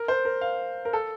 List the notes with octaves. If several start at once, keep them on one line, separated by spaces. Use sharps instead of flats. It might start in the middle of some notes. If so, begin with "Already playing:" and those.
Already playing: A#4
C5
A#4
F5
A#4
A4